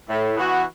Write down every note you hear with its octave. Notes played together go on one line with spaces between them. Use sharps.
A2
E3 B3 F#4